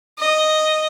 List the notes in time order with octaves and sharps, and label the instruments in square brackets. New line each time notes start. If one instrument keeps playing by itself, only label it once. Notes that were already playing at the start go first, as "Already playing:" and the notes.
[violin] D#5